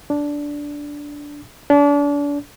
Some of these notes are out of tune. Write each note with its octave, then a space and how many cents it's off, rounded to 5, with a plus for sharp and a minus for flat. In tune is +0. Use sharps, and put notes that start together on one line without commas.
D4 -10
D4 -35